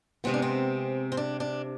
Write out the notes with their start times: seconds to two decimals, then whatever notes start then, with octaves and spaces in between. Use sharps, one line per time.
0.24 C3 G#3 B3 C4
0.34 D4
0.42 C4
1.12 C4
1.17 D4
1.40 D4